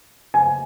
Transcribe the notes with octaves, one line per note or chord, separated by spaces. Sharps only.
G#5